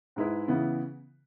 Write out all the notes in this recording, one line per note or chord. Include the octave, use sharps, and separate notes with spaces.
G#2 G#3 E4 B4
C#3 E3 B3 E4